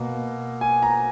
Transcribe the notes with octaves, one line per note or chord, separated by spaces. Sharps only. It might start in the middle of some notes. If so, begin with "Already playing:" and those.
Already playing: B2 A#3
G#5
A#5